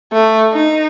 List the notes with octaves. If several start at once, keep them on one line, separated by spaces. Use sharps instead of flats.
A3
D#4